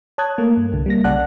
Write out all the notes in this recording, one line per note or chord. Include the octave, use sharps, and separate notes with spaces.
C#5 A5 D#6 F#6 G#6
A3 A#3
G2
C2 D3
G3 A#3 A#6
B1 C#3 D5 F#5 A5 F#6